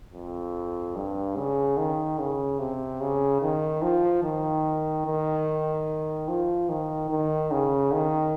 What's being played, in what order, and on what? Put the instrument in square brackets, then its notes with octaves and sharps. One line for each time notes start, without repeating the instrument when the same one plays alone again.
[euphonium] F2
G2
C#3
D#3
C#3
C3
C#3
D#3
F3
D#3
D#3
F3
D#3
D#3
C#3
D#3